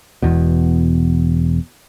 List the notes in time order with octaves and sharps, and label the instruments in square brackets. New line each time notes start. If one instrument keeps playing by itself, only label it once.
[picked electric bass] E1 E2 B2